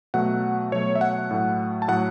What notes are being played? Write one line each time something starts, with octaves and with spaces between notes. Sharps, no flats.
B2 F#3 A3 F#5
B2 F#3 A3 C#5
E5
F#5
A2 F#3 A3
A5
A2 F#3 A3 F#5